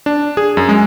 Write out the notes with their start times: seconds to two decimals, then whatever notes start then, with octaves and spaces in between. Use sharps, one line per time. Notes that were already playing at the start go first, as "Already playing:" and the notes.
0.06 D4
0.37 G#4
0.57 F#2
0.69 G#3